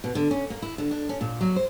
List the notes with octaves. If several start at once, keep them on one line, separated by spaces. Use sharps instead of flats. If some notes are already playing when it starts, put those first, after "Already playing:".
B2
D3
C#4
A#3
E4
D3
D4
C#4
A#2
F#3
C5